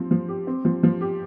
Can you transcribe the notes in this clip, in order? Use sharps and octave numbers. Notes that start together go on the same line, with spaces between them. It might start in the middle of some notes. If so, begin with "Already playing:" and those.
Already playing: F3 C4
F3
G4
C4
F3
F3
G4